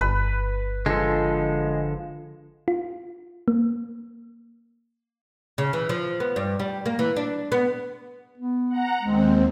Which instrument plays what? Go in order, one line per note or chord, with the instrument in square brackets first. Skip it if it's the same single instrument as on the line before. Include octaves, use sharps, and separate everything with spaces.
[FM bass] G1 [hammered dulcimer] B4
[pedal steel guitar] D3 A4 [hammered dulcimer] F3 [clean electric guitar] G#3
[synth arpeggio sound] F4
A#3
[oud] C#3
E3
F3
B3
G2
G3
A#3
E3
D4
B3
[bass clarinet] B3
[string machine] F#5 A#5
[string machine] D#2 C4 [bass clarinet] G#3